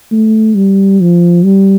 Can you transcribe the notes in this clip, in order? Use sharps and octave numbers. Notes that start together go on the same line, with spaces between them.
A3
G3
F3
G3